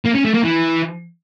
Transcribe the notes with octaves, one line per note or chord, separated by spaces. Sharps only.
A#3
C#4
A3
A#3
E3